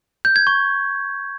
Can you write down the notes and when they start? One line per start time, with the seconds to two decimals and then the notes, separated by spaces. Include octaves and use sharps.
0.25 G6
0.36 G#6
0.47 C#6